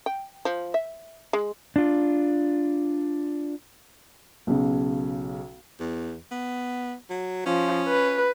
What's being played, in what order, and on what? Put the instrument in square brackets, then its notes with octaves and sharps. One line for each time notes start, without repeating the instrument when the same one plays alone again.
[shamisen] G5
F3
E5
G#3
[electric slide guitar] D4 F4
[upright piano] B1 C#3
[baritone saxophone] E2
B3
F#3
[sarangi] F3 [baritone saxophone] C#4
[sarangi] B4